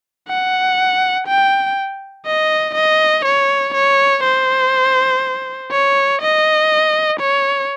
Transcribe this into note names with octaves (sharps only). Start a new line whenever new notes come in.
F#5
G5
D#5
D#5
C#5
C#5
C5
C#5
D#5
C#5